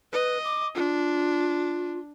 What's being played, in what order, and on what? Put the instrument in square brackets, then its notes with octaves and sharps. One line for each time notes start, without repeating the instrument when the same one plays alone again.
[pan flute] B4 [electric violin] D#5
[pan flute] D6
[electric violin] D4 [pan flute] F4